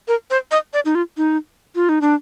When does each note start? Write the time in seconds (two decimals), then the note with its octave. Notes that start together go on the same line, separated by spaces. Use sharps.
0.08 A#4
0.31 C5
0.51 D#5
0.73 D5
0.85 D#4
0.95 F4
1.17 D#4
1.75 F4
1.89 D#4
2.01 D4